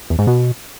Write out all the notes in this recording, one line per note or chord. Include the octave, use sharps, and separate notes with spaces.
E2
G#2
B2